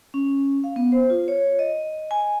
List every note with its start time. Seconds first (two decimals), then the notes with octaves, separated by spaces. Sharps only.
0.14 C#4
0.64 F5
0.76 B3
0.92 C5
1.10 F4
1.28 C#5
1.59 D#5
2.11 G#5